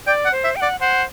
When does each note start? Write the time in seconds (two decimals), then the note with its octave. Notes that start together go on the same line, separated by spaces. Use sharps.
0.06 D5 G5
0.25 F#5
0.32 C5
0.44 E5
0.56 G5
0.60 D5 F#5
0.80 C5 F#5